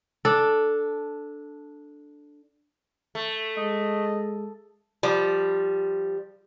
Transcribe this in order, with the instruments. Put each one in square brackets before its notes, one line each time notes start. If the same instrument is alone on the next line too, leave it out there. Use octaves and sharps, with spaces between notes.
[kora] D4 A4
[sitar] A3
[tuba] G#3 [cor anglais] D#5
[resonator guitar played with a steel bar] F3 G3